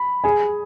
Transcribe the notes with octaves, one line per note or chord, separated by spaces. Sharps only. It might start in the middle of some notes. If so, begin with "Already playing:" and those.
Already playing: B5
G#4 G#5